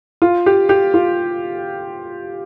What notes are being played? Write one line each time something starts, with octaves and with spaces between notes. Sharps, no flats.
F4
G4
G4
F4